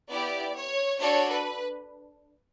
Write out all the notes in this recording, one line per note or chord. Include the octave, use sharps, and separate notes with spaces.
B3 E4 G4 D5
C#5
D4 F#4 A4 C#5
B4